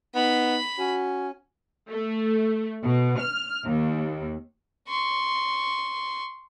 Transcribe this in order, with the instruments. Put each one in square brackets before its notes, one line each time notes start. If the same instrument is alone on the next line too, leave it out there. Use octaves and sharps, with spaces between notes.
[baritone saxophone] B3 [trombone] D#4 [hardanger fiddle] B5
[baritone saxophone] C#4 [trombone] F#4
[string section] A3
B2
F6
D#2
[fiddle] C6 C#6